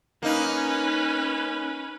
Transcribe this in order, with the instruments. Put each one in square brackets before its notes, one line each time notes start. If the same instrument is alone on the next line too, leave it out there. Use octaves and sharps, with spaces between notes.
[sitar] A#3 D#4 [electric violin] C#4 B4